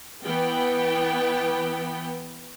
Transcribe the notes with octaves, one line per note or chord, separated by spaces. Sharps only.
E3 B3 G5